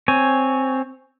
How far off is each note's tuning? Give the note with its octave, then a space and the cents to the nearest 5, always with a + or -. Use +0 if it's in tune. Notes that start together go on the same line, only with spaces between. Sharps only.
C4 +0 C#5 +0 G#5 +0